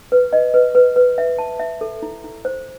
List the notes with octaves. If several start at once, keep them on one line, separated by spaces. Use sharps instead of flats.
B4
D#5
B4
B4
B4
E5
A5
E5
A4
E4
E4
C5